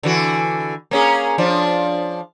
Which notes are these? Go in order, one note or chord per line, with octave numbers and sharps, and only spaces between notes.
D3 E3 F#4
A#3 C#4 G#4
F3 D4